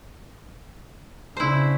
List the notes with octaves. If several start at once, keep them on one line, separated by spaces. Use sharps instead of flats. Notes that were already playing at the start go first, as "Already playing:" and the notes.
C#3 D4 E4 C5